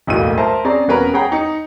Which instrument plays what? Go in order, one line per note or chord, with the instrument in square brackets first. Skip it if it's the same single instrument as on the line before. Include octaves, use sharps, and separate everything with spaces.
[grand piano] E1 B1 A2 A#3 D#7
A#4 C5 E5 A5 A#5
C4 C#4 G#4 C5 D5 A#5
E1 B3 C#4 A#4 B4 A#5
G#4 C#5 F#5 G5 A#5 B5
D#4 C#7